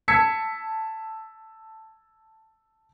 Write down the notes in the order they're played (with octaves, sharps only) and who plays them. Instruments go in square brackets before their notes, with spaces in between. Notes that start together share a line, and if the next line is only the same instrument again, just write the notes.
[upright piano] A5 E6 G#6 B6 C#7